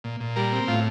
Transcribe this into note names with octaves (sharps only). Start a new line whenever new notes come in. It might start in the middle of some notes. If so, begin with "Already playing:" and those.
A#2
A#2
G3 A#4
C4
A2 F4